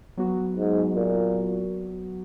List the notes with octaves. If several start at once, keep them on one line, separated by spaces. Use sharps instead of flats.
F#3 B3 F#4
G#2
A#2